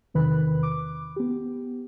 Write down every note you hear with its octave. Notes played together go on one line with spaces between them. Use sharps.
E2 C3 D#3 B4 B5 F#6
D6
B3 G4